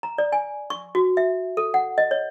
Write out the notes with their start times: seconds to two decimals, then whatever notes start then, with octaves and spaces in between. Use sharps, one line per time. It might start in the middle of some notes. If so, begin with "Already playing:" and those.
0.03 A#5
0.18 D5
0.32 G#5
0.70 C#6
0.95 F#4
1.17 E5
1.57 A4
1.74 F#5
1.98 D#5
2.11 C#5